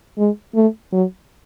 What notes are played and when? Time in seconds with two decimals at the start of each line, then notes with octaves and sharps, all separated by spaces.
0.18 G#3
0.55 A3
0.93 F#3